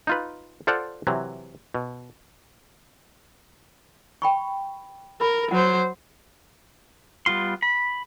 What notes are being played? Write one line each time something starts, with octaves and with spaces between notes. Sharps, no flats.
D#4 F4 B4
F4 A4 C5 D5 F5 F#5
C3 E3 F#3
B2
G5 B5 C#6
A#4 B5
F#3 C5 F#5
G3 B3 F4 C6
B5